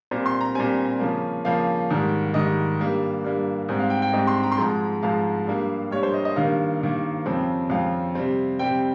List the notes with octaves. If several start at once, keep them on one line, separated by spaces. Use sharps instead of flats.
A#2 G3 C4
C6
A#5
A#2 G3 C4 G#5
C#3 F3 A#3
C#3 F3 A#3 F5
G#2 D#3 G3
G#2 D#3 G3 D#5
G2 G3 A#3
G2 G3 A#3
G#2 G3 C4
F5
G5
G5
G#2 G3 C4 D#5
C6
A#5
C6
G#2 F3 G#3 A#5
G#2 F3 G#3 F5
G2 G3 A#3
G2 G3 A#3 C#5
C5
D#5
D#5
G2 D#3 A#3 F5
G2 D#3 A#3
F2 C#3 F3 C4
F2 C#3 F3 C4 F5
C3 G3 C4
C3 G3 C4 G5